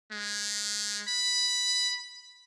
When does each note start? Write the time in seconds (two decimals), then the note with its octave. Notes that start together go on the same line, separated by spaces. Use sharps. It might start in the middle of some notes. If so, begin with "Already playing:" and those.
0.12 G#3
1.08 B5